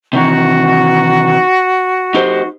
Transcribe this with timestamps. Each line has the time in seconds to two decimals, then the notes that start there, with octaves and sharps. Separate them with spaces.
0.13 C3 D#3 E3 F#4
2.14 D#4 G4 C5